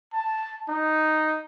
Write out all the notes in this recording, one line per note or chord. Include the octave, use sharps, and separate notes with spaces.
A5
D#4